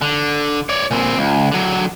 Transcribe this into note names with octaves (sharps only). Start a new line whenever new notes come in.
D3
C#5 D5
A#2 C4
C#2
D3 F#3